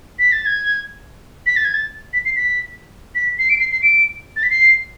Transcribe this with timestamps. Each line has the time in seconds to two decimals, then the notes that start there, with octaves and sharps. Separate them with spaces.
0.19 B6
0.32 A6
0.46 G#6
1.46 B6
1.56 A6
1.65 G#6
1.74 A6
2.13 B6
2.25 C7
2.36 B6
3.15 B6
3.39 C7
3.50 D7
3.60 C7
3.72 C7
3.82 D7
4.36 A6
4.43 B6
4.50 C7